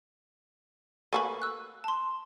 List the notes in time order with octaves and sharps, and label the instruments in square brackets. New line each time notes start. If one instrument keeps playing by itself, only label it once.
[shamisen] A3 A#3 B4 [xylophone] G#5 C#6
[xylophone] E6 F#6
A5 C6